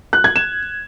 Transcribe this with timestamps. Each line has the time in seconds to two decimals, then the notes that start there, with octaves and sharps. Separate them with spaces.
0.13 F#6
0.24 G#6
0.36 E7